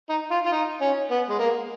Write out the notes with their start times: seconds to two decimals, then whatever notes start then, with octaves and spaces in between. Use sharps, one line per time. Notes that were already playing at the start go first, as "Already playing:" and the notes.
0.09 D#4
0.31 F4
0.46 F4
0.52 D#4
0.81 C#4
1.10 B3
1.29 G#3
1.39 A#3